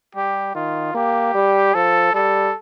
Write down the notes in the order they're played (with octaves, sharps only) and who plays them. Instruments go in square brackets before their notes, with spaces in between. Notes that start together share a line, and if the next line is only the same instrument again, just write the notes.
[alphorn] G3 [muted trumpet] G4
[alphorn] D#3 [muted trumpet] F4
[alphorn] A#3 [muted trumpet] G4
[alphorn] G3
[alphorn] F3 [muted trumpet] A4
[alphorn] G3 [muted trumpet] A4